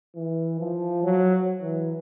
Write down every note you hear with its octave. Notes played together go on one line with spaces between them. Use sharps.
E3
F3
F#3
E3